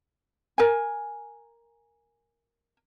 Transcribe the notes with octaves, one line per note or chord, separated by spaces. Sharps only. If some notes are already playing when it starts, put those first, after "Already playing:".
A#4 G#5